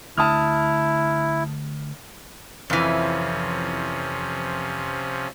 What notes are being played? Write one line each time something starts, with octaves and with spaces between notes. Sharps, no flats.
D3 A3 E4 A5 D#6 F6
F2 C3 E3 F3 C#4